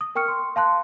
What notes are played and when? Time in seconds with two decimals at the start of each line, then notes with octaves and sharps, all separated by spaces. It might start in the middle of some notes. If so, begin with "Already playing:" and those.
0.01 D#6
0.15 A#4 G5 C#6 F6 C#7
0.28 C6
0.56 F5 A5 C6 F#6